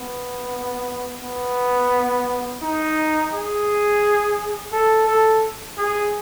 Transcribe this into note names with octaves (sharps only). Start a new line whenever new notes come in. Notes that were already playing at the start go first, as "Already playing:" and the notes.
Already playing: B3
B3
D#4
G#4
A4
A4
G#4